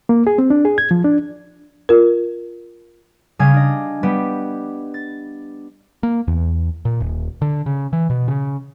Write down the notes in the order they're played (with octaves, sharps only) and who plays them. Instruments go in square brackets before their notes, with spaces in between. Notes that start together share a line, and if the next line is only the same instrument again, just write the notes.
[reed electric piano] A#3
G#4
C4
D4
G#4
G#6
F3
D4
[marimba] F4 A#4
[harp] C#3 G3 F5 G#5 D#6 G#6
D4 D#5
G3 B3 G4
A6
[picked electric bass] A#3
E2
A#2
D#1
D3
C#3
E3
B2
C#3